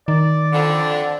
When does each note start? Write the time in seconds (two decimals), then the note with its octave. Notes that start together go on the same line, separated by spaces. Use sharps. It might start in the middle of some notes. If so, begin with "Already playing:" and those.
0.08 D#3 D5
0.52 F2 D3